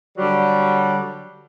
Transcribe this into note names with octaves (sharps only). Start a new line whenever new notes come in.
D3 F#3 G3